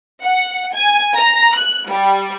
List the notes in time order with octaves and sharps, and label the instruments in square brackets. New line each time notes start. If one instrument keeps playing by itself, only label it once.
[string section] F#5
G#5
A#5
F#6
G3